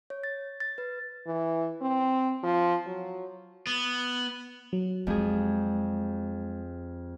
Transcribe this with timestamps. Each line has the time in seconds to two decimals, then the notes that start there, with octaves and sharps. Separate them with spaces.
0.10 C#5
0.24 A6
0.60 A6
0.78 B4
1.27 E3
1.81 C4
2.43 F3
2.87 F#3
3.67 B3
4.73 F#3
5.07 F2 G#3 G#4